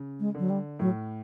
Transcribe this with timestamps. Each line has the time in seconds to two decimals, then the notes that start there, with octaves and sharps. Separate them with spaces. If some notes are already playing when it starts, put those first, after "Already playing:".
Already playing: C#3
0.20 G#3
0.35 D3 F#3
0.50 G3
0.79 A2 F#3